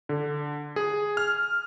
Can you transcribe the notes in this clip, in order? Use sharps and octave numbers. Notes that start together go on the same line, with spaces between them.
D3
G#4
F6